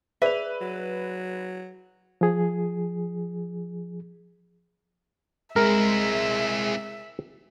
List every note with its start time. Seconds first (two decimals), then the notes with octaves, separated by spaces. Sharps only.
0.22 G#4 B4 D5 E5 F7
0.61 F#3
2.21 F3 G#4
5.56 G#3 C4 E4 A#4 E5